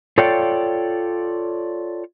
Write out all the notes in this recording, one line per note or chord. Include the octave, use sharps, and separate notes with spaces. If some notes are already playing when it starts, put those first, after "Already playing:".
F4 A4 C#5 D5 F5 G5